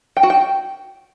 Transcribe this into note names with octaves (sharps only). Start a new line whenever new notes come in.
G5
F#4
G5